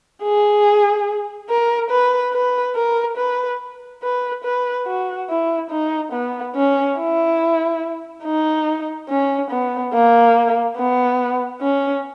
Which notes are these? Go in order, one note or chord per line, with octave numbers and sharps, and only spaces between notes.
G#4
A#4
B4
B4
A#4
B4
B4
B4
F#4
E4
D#4
B3
C#4
E4
D#4
C#4
B3
A#3
B3
C#4